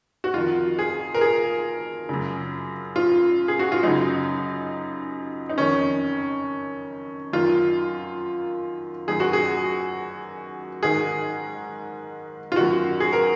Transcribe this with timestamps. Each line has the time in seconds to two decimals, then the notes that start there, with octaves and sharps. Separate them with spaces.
0.24 F#4
0.34 F2 D#3 F4
0.79 G#4
1.14 A#4
1.21 G#4
2.09 F#2 C#3
2.96 F4
3.48 G#4
3.59 F#4
3.72 F4
3.83 F#2 C#3 D#4
5.49 D#4
5.58 F2 D#3 C#4
7.33 F#2 D#3 F4
9.07 F#2 D#3 G#4
9.20 F#4
9.33 G#4
10.83 G#2 D#3 G#4
12.52 F4
12.56 F#2 D#3 F#4
13.00 G#4
13.13 A#4